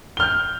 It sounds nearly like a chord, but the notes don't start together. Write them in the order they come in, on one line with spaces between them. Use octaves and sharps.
G7 F6 G6